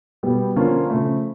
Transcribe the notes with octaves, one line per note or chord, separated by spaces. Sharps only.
B2 G3 B3
D3 F3 A#3 C#4 F4
C#3 F3 A3